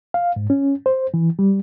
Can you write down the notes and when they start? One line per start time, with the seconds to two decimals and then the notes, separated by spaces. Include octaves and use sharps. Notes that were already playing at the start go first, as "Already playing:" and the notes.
0.14 F5
0.36 G#2
0.50 C#4
0.86 C5
1.14 E3
1.39 G3